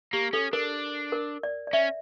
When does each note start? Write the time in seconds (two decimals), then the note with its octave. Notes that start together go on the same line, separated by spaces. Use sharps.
0.13 A#3 G4
0.33 C#4 A4
0.53 D4 A#4
1.12 A#4
1.43 D5
1.67 D5
1.73 C#4 E5